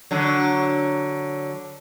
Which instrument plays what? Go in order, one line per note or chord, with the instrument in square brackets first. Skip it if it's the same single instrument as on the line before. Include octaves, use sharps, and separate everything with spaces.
[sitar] D3 F#3